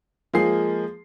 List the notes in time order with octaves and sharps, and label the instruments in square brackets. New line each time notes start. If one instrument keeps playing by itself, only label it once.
[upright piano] F3 G#3 A#3 G#4 C7